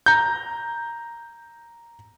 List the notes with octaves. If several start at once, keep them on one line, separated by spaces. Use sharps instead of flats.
A#5 G6